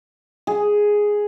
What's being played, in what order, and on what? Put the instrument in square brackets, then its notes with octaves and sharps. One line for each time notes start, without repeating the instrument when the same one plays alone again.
[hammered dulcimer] G#4